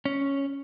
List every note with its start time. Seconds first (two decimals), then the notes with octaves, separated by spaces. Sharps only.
0.05 C#4